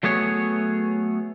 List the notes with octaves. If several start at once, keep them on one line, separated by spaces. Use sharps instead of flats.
F#3 A3 B3 G#4 C#5